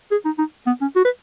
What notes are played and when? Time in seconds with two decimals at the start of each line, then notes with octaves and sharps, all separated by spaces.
0.11 G#4
0.25 D#4
0.38 D#4
0.67 B3
0.81 C#4
0.96 F#4
1.05 B4